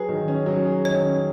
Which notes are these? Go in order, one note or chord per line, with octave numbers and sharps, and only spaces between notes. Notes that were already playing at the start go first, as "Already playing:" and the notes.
Already playing: F#3 G#4 B4
D#3
C#4
F#3
G#4
D#3 C#5
C#4